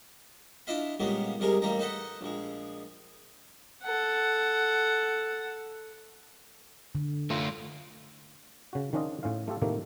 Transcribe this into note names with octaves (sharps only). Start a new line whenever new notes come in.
D4 E4 F4 D#5 F5 B5
A#2 C#3 G3 G#3 A#3 B3
C2 C3 G3 G#3 G#4 A#4
A1 G3 A#3 D#4 A#5
D#4 A4 B4 D#5 F#5
A#1 G#3
A4 F#5
D3
A3 F4
C#3 F#4
D#3 F3 C#4 D4 F4 D#5
A2 C#4 F4 F5
A3 F4 G4 A4
A2 C3 D#3 F3 A3 A#3